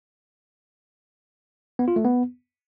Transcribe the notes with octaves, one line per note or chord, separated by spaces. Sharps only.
B3
F4
A3
B3